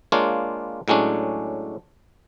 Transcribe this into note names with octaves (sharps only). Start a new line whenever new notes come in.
G#3 A#3 D4 F4 C#5
A2 F#3 G#3 C#4 D4